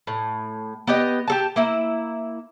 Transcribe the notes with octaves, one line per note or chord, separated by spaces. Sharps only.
A2
B3 G4 D#5
G4 A4 A5
A#3 E4